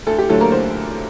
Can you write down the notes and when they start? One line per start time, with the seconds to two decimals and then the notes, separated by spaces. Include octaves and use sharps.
0.07 D2 A4
0.19 G4
0.29 D3 F#3 A3 A4
0.40 A#3 A#4
0.52 C5